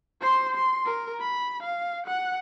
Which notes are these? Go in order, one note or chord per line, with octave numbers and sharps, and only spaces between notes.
C5 C6
C6
A#4
B5
F5
F#5